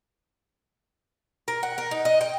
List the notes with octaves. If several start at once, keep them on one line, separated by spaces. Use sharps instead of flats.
A#4
F#5
A#4
D#4
D#5
G5